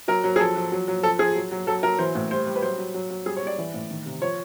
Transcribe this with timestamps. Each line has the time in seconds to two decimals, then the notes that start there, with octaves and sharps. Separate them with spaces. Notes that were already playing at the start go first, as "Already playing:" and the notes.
0.08 F#3 A#4
0.24 F#3
0.36 G#4
0.40 F3 A4
0.56 F3
0.72 F#3
0.88 F#3
1.03 F3 A4
1.19 F3 G#4
1.35 F#3
1.51 F#3
1.67 F#3 A4
1.83 F#3 A#4
1.99 E3 C5
2.15 A2
2.31 G3 C5
2.47 G3
2.56 B4
2.62 F#3 C5
2.78 F#3
2.94 F#3
3.10 F#3
3.26 G3 G#4
3.37 C#5
3.42 G3 D5
3.58 E3
3.74 A2
3.90 D#3
4.06 C3
4.21 F3 C#5